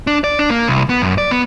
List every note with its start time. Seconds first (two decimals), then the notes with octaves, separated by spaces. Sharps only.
0.07 D4
0.24 D5
0.39 D4
0.50 A#3
0.68 C2
0.90 B3
1.02 F#2
1.18 D5
1.31 B3